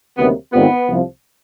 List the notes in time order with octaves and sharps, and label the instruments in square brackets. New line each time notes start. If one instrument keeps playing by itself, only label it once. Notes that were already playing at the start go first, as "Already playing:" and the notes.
[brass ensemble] D2 C3 D#3 F#3 A#3 [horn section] B3
[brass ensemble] G#2 D#3 G3 C4 F4 [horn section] B3
[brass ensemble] C2 C3 F3